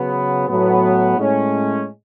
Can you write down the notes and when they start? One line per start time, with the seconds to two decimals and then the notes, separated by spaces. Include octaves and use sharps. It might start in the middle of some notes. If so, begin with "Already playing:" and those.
Already playing: C#3 F#3 B3
0.47 A2 F#3 B3
1.18 A2 G#3 C#4